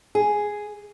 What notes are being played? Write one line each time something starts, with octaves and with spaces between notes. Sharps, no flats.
G#4